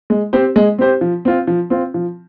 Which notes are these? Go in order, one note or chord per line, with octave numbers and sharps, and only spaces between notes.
G#3
C4 G4 C5
G#3
C4 G4 C5
F3
C4 F4
F3
C4 F4
F3